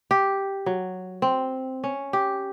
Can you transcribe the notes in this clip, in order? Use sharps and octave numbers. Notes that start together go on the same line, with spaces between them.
G4
F#3
C4
C#4
G4